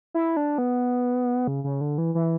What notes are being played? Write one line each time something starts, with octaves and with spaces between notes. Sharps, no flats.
E4
D4
B3
C#3
C#3
D3
E3
E3